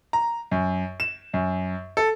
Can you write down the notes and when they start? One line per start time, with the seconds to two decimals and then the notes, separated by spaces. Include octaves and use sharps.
0.13 A#5
0.51 F#2
1.00 E7
1.34 F#2
1.97 A4